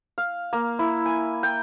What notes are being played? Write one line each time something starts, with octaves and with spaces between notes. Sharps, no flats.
F5
A#3
E4
G#5
G5